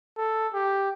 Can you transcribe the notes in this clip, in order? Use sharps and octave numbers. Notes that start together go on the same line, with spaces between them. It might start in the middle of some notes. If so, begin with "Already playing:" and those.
A4
G4